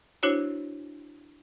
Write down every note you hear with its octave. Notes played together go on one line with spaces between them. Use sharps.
D4 E4 F#4 C5 C#5